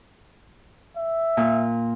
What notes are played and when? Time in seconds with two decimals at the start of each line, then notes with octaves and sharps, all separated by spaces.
0.97 E5
1.37 A#2